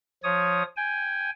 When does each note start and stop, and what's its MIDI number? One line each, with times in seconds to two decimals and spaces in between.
0.23 0.63 53
0.23 0.63 73
0.23 0.63 87
0.76 1.30 79
0.76 1.30 80